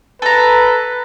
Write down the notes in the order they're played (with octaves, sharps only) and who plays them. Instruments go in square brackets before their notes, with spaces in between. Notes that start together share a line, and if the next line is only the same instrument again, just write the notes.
[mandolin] A4 A#5 [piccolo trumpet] B4